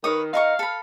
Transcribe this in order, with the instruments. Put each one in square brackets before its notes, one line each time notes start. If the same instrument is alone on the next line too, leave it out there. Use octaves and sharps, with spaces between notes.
[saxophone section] D#3 [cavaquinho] B4 C#5 D#6
[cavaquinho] D#4 A#4 C#6 [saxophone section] F5
[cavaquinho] A4 B5